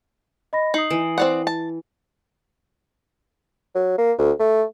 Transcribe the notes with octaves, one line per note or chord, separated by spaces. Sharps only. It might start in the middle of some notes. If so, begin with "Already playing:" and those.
D#5 B5 A#6
D#4 D#6 C7 F#7
E3
C4 D5 F#5
A5
F#3
A#3
D2
A3